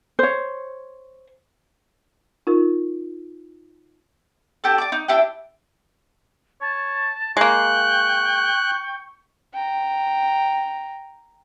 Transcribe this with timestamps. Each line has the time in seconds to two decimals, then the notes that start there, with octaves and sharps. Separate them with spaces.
0.19 C5 C#5
2.47 D#4 F4 A#4
4.64 D4 G4 A4
4.78 D5 D6
4.92 D#4
5.08 D4 E4 G4 G5
6.61 C#5 A5
7.37 G#3 A#3 G5 C#6 F#6
9.54 G5 A#5